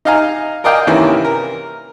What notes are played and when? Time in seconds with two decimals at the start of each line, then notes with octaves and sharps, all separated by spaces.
0.05 D#4 D#5 F5 G#5 A#5
0.64 A#4 D5 D#5 F5 G5 G#5
0.87 C3 D#3 E3 A#3 C#4
1.24 A#4